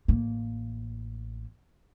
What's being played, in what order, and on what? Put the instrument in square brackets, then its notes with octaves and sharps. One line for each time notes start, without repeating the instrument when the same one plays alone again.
[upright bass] A1 A#3